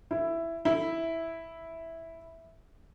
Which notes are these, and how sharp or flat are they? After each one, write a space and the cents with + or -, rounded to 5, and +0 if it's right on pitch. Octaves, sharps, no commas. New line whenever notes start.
E4 +10
E4 -5